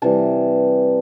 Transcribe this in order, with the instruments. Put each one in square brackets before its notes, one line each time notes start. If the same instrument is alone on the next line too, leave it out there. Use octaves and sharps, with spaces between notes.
[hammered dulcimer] C3 E3 G3 A5